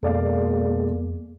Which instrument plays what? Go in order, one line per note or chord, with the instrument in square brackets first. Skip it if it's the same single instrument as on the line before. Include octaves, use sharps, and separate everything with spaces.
[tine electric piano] F2 [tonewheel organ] B2 G#3 [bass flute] A#3 [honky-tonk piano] A4 D5 F5